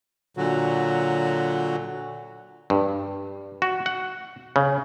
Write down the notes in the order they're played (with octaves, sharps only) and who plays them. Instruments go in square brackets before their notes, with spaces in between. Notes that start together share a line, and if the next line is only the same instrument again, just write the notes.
[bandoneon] A#2 D3 F#3 F#4
[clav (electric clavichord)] G2
F#4
F#5
C#3